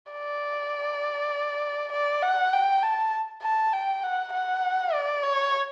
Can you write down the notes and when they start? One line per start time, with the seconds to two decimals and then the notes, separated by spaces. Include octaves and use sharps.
0.12 D5
1.92 D5
2.22 F#5
2.53 G5
2.82 A5
3.42 A5
3.73 G5
4.03 F#5
4.33 F#5
4.93 D5
5.23 C#5